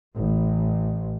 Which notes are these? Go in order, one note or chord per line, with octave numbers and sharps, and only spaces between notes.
A1